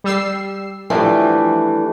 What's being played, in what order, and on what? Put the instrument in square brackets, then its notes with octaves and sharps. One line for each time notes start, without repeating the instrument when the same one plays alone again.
[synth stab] G3 E6 C7
[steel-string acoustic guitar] E3 G3 [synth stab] F3 [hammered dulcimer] A3 D4